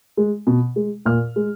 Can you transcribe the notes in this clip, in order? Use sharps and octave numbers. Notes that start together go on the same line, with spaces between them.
G#3
B2
G#3
A#2 F6
G#3